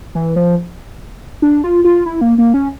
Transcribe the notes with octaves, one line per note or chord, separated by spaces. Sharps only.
E3
F3
D4
F4
F4
E4
A#3
A#3
C#4